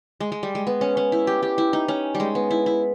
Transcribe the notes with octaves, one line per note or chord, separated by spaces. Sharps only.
G#3
G#3
G3
G#3
B3
C#4
C#4
E4
G4
G4
E4
D#4
C#4
G3
G#3
B3
E4
E4